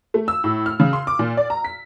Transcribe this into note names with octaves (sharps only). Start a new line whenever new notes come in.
A3
E6
A2
F6
C#3
C6
D6
A#2
D5
A#5
B6